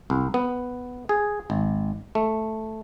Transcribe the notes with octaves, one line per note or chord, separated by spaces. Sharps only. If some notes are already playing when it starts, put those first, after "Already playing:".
C2
B3
G#4
G#1
A3